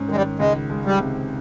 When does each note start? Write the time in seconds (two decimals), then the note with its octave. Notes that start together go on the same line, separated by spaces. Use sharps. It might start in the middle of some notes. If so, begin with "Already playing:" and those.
Already playing: G#2 C#4
0.08 D#3 G#3
0.16 G3
0.39 C#2 G#3
0.70 G#3
0.85 G3
1.00 C3